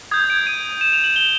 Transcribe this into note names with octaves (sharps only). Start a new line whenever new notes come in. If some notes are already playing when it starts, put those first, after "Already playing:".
D#6 G6 G#6
D7
D#7
E7
F7
F#7
G7